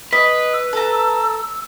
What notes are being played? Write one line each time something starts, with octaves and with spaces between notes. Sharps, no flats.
B4 D#5 B6
E6
A4 A#5